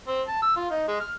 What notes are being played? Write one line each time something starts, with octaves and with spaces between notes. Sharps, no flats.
C4
A5
E6
F4
D#4
G#3
F6